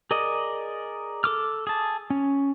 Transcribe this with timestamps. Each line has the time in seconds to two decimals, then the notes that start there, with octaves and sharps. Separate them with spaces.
0.11 G#4 A#4 D5 D#5
1.24 A4 D6 F6
1.67 G#4 A5
2.10 C#4